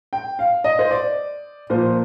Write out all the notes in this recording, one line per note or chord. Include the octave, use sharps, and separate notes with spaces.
G5
F5
D#5
C5
D5
A#2 F3 C5